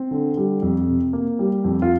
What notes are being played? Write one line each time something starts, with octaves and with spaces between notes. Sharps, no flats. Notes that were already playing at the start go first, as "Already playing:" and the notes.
Already playing: C4
D3
G3
F2
C3
A#3
G3
F2
F4